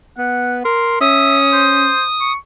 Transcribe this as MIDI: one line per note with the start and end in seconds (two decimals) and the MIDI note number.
0.18 0.60 59
0.18 0.56 78
0.65 0.96 70
0.65 0.96 84
1.01 1.91 61
1.01 1.38 76
1.01 2.32 87
1.53 2.03 72
2.21 2.36 85